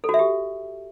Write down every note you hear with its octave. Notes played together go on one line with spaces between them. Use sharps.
A4
F#4
E5
G4